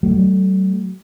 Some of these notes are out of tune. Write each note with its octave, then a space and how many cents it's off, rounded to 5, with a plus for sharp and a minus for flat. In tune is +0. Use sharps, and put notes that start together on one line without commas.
F#3 +45 A3 +0